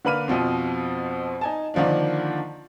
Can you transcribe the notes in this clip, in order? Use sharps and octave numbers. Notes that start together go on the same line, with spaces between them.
D3 A#3 B4 B5 F6 D#7
F2 B2 F3 C4
D#4 G#5 A5
D3 D#3 F3 A#3 D4